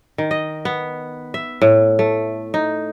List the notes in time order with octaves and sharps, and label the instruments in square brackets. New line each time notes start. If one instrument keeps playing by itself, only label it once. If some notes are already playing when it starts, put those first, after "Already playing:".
[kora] D#3
D#5
B3
E5
A2
A3
D#4